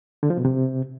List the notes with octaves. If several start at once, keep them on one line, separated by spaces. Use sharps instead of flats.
D3
F3
B2
C3